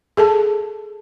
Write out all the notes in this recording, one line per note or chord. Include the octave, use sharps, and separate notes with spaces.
G#4 A4 A5